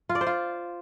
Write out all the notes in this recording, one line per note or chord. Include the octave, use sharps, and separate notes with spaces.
F4
D5
C5
F4